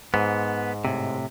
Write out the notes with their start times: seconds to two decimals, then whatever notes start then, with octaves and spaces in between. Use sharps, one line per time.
0.14 G#2 B3
0.85 A2 C3